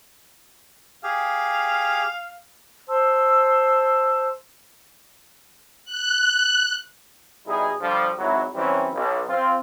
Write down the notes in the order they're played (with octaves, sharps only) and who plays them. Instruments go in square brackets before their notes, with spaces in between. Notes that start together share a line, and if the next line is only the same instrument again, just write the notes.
[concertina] G4 G#4 [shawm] F5
[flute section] C5 A5 C6 E6
[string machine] F#6
[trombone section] B2 G3 D#4 E4 G#4
D3 F3 G3
G#1 F#3 E4
E3 F#3 G3 C4 C#4 E4
B1
C4 F4